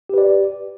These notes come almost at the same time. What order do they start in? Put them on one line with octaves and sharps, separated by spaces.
G4 B4 D5